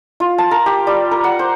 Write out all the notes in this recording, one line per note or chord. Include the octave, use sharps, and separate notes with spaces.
F4
A5
A#4
G4
G3
A#4
F#5
C5